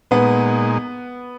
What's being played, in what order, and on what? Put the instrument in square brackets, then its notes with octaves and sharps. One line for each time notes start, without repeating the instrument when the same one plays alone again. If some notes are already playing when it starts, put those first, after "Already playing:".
[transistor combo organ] A#2 G#3 D#4 [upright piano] B3 B4